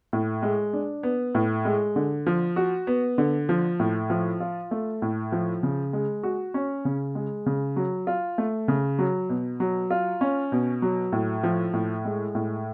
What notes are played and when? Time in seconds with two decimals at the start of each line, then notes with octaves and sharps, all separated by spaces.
0.13 A2
0.43 G#3
0.73 D4
1.03 B3
1.35 A2
1.65 G#3
1.96 D3
2.26 F3
2.56 F#4
2.87 B3
3.18 D3
3.49 F3
3.80 A2
4.10 F3
4.40 F4
4.71 A3
5.02 A2
5.32 F3
5.63 C#3
5.93 G#3
6.23 F#4
6.54 C#4
6.85 C#3
7.15 G#3
7.46 C#3
7.76 F#3
8.07 F4
8.38 A3
8.68 C#3
8.99 F#3
9.29 B2
9.60 F#3
9.90 F4
10.21 C#4
10.52 B2
10.82 F#3
11.12 A2
11.43 F3
11.74 A2
12.05 G#3
12.35 A2